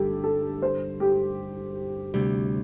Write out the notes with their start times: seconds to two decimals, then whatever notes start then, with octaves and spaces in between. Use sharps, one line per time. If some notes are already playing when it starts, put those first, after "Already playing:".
Already playing: G1 G2 G3 D4 G4 A4
0.24 A4
0.62 C5
1.00 G4
2.14 D2 C3 G3